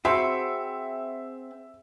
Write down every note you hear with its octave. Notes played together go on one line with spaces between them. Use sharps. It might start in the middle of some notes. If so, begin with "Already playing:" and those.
C4 F#4 G#4 E5 B5 C6 C#7